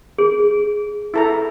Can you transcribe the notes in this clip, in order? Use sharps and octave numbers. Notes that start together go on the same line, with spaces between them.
G#4
E4 A4 A#5